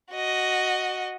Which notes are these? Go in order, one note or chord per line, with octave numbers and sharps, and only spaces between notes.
F#4 D#5